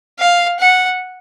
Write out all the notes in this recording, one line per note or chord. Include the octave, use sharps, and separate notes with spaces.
F5
F#5